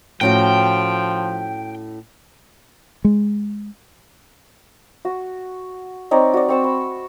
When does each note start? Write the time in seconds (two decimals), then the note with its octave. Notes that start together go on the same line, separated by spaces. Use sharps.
0.21 A2 F3 C#4 F#4 G5
3.05 G#3
5.05 F#4
6.11 C4 D#4 C#5 D5
6.34 F#4 D5
6.48 C4 C#6 E6
6.64 B5